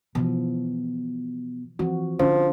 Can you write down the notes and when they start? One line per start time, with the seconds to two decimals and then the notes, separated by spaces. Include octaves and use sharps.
0.15 B2 E3 F3
1.79 E3 F3 C4 F#4
2.19 D3 F3 C#4